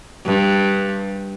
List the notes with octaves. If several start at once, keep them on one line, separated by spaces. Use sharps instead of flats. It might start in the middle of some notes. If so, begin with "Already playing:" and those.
G2